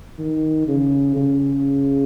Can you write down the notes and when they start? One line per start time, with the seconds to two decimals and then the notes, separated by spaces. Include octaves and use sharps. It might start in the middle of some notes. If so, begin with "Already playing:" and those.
0.19 D#3
0.68 C#3
1.16 C#3